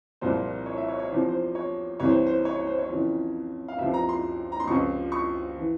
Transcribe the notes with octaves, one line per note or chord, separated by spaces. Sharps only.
C2 A#2 F3 C5
C#5
E5
C#5
C#5
E2 C3 F3 C5
C5
C#5
C2 C3 E3 C#5
C5
C5
C#5
C#5
C5
C#5
F2 C#3 E3
F5
C#2 C3 F3 E5
A#5
C6
A#5
C6
C#2 C3 F3 C#6
C#6
E3